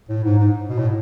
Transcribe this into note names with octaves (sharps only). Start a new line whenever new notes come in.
A2
G#2
G#2
B2
A2